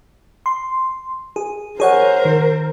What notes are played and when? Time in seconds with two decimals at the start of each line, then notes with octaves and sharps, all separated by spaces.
0.46 C6
1.36 G#4
1.80 G#4 A#4 C5 C#5 F#5
2.25 D#3